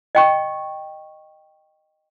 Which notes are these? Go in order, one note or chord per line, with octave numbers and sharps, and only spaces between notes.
D#5 G5 C#6